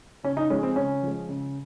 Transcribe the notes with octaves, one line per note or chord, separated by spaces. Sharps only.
C#3 C#4
D#4
F3 G#3 C#4
C4
C#3 C#4
F3 G#3
C#3